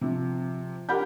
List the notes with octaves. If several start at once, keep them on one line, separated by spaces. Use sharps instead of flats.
C3 F3
G4 A#4 F#5 B5 G6